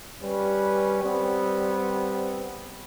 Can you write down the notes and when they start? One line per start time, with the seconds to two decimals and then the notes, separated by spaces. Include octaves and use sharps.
0.22 G3 C#4 B4
1.02 G3 B3 C4